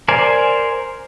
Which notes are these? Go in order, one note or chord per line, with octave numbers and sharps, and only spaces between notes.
A#4 C5 D5 G#5